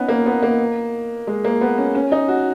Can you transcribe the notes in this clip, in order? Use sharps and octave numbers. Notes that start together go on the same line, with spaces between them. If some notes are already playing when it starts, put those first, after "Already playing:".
Already playing: B3 C#4 D#4
A#3
B3
A#3
G#3
A#3
B3
C#4
C#4
D#4
F#4